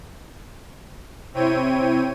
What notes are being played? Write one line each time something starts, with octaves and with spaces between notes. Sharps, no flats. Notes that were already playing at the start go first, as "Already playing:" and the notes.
C3 C4 E4 C#5 G5 D#7